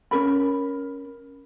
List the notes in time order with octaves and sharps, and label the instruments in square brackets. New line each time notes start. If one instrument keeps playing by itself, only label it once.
[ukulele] C#4 D#4 A#4 B5